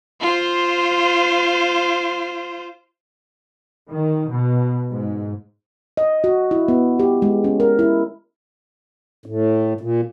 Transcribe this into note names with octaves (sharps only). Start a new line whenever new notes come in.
F4 C5
D#3
B2
G#2
D#5
F#4
E4
B3
G4
G#3
C#4
A#4
E4
A2
A#2